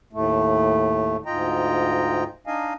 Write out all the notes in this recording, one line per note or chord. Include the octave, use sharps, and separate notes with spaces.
D#2 A2 A3
D2 G#2 F4 D#5 G5 A#5
D4 D#4 D#5 F5 G#5